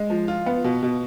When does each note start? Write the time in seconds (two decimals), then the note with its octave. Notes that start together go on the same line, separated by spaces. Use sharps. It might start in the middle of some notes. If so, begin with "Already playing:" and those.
Already playing: G#3
0.10 F3
0.28 F4
0.46 B3
0.64 B2
0.83 B2